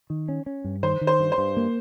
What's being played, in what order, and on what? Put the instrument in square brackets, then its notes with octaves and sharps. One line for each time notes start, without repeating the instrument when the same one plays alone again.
[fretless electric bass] D#3
C#4
C#4
G2
[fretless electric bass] D#3 [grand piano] C5
[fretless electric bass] D#3
[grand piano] C5
[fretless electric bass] G2
[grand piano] C5
[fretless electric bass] G2
A#3